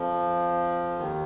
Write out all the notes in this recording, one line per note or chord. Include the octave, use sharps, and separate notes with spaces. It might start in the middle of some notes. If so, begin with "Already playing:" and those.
Already playing: F2 F3
D#2 D#3